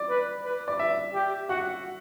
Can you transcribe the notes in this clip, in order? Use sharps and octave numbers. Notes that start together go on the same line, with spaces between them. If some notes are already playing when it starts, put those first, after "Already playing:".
Already playing: D5
B4
B4
D5
E5
G4
F#4 F#5